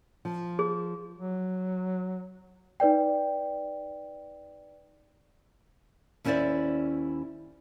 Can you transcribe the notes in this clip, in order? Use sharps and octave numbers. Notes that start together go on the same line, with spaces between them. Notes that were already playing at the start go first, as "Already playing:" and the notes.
F3
G#4
F#3
D#4 B4 D5 G5
D#2 C#4 E4 C5 D5 E5